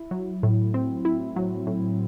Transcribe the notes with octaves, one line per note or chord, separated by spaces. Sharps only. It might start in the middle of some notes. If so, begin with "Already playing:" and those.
Already playing: E4
F#3
A2
C4
E4
F#3
A2